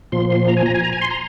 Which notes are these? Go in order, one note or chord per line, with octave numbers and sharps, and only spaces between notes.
A#2 F3 C6
C6
A#5
G#5
A#5
G#5
A#5
G#5
C6
A#5